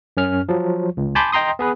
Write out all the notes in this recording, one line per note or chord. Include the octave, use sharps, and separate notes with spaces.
F#2 C#4 F6
F3 F#3
C#2
G#5 A5 B5 C6 D6 G6
D#5 G5 A#5 C6 D#6
B3 G#4 B4